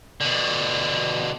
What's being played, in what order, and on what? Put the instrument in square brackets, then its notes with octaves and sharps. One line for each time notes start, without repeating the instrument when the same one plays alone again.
[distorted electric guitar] B2 D3